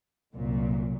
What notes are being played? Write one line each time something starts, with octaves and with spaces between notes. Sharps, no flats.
C2 F#2 A#2